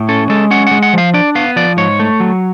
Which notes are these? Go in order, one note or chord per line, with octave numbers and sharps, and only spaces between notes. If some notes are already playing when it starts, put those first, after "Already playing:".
Already playing: A2
C#4 A4
G#3 A4
C#4 F#5
G#3 F#5
F#5
F3 F5
D4 D5
B3 F5
F3 D5
G#2 C#5
A3
F#3